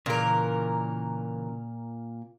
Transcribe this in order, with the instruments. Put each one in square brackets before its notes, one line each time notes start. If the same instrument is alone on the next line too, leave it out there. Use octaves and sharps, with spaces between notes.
[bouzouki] A#2 A#4 [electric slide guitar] C#3 E3